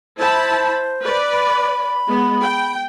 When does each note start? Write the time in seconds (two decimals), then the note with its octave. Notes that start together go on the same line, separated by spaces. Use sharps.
0.18 E4 C5 A5 B5
1.03 B4 D5
1.33 B5
2.08 G#3 B3
2.42 G5